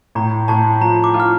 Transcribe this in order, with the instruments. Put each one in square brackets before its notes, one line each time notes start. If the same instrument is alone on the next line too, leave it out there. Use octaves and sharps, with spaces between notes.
[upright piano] A2 [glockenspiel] A#5
[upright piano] A2 [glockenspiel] A5
[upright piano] F3 [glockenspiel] A#5
[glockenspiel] D6
[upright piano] F4
[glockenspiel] F6